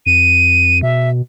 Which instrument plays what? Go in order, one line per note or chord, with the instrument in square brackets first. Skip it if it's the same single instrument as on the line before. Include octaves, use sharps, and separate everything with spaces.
[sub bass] F2 [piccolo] D#7
[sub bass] B2 [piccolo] E5